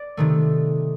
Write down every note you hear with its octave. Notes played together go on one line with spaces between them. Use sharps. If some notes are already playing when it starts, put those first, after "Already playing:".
Already playing: D5
C3 D#3 A3